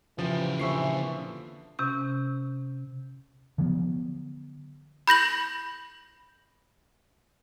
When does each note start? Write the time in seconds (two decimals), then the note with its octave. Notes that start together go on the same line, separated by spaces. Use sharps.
0.19 C#3 E3 F3 G4
0.60 A#2 D3 F3 E5 C#6 C7
1.79 C3 C#4 G6
3.58 D3 F3 F#3 B3
5.08 B5 G6 A#6 F#7